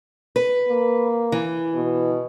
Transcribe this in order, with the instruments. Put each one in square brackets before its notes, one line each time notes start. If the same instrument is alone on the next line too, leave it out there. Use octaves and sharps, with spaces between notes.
[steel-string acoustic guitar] B4
[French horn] A#3
[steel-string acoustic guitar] E3
[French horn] B2